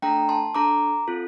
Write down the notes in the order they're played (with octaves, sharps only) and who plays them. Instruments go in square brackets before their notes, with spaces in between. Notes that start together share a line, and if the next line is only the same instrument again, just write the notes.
[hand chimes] A3 D4 A4 G5 A#5
A5 C6
D4 A4 A#5 D6
C4 F4 A4